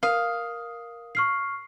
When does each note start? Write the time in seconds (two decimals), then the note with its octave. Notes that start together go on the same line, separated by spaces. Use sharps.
0.03 A#4 F5 D#6
1.15 C#6 F6 C7